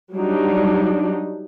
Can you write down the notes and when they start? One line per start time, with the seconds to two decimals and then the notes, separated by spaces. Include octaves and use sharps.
0.14 F#3 G3 D4 D#4